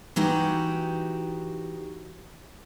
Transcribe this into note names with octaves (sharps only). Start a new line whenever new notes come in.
E3 D#4 F#4 G4